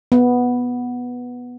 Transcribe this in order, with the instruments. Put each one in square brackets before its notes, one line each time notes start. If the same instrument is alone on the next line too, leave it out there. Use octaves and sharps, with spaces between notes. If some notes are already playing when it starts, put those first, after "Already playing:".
[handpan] B3